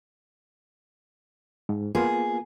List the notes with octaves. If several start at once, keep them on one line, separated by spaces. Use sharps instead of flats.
G#2
A#3 B3 F4 G#4